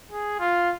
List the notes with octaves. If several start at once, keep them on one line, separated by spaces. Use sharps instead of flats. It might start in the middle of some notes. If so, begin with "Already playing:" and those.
G#4
F4